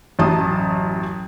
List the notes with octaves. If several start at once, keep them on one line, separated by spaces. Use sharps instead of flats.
A1 F#2 A5 D#6